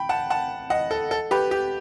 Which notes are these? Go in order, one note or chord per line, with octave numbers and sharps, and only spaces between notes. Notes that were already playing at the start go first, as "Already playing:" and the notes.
Already playing: G5 B5
F#5 A5
F#5 A5
D#5 F#5
A4
A4
G4 B4
G4